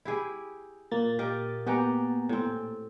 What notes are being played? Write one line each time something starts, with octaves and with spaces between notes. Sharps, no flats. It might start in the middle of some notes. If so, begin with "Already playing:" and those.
E4 G4 G#4
A#2 A#3 A6
G4 A#4 D#5
B3 F#4 G4 D#5 G#5 A#5
A2 C4